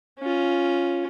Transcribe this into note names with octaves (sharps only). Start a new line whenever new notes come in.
C#4 F4